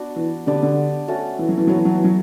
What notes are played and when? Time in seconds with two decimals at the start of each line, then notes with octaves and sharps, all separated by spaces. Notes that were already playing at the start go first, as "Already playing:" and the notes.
Already playing: B3 D4 F#4
0.16 E3
0.46 D3 G3 B3 D4 G4
0.63 D3
1.08 A3 C#4 F#4 A4
1.39 E3
1.49 F#3
1.57 E3
1.67 F#3 B3 F#4 C#5
1.76 E3
1.85 F#3
1.95 E3
2.04 F#3